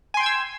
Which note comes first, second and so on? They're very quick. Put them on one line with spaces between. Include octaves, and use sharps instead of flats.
G#5 C6 G5 G#6 E6